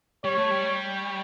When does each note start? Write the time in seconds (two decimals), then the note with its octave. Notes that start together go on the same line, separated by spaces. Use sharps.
0.24 G3 C#5
0.37 A3
0.51 G3